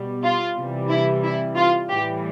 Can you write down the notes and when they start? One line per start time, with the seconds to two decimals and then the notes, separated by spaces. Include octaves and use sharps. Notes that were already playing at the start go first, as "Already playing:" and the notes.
Already playing: B2 G3
0.23 F4
0.56 C3 E3 G3
0.89 E4
1.23 E4
1.57 F4
1.90 A2 E3 G3 G4